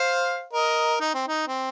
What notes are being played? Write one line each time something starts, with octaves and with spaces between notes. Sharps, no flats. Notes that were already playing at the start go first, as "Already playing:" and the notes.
Already playing: C5 F5
A#4 D#5
D#4
C4
D#4
C4